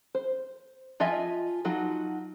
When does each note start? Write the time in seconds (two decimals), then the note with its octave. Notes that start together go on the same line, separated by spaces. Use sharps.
0.15 C5
1.00 F3 F4 D#5 E5 G#5
1.65 F3 F#3 D#4 F4 F#4